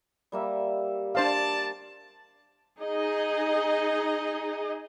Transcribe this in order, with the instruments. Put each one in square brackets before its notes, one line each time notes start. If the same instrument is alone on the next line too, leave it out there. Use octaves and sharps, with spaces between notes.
[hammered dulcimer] G3 A#3 E5
[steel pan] D4 C5 F5 [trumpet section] D5 A5
[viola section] D#4 G#4 D#5